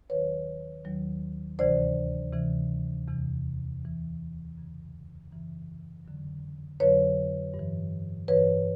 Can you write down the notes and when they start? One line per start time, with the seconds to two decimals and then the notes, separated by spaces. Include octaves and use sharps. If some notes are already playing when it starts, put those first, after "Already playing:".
0.09 D#2 D#3 F#3 B4 C#5
0.85 D#2 D#3 F#3
1.59 D2 C3 E3 C5 D5
2.33 D2 C3 E3
3.08 E2 C3 E3
3.82 E2 C3 E3
4.57 F#2 C#3 E3
5.31 F#2 C#3 E3
6.05 F2 D3 F#3
6.80 F2 D3 F#3 B4 C#5
7.54 G2
7.59 E3
8.28 G2 E3 B4 C#5